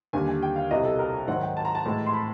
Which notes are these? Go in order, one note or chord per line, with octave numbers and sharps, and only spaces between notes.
D#2 D3 G3 G#5
G#5
G5
F5
C2 B2 G3 D#5
A4
A#4
G#2 D#3 F#3 F#5
G5
A5
A#5
A5
A2 E3 G#3
C6
B5